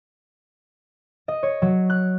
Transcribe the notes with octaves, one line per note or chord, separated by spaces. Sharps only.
D#5
C#5
F#3
F#6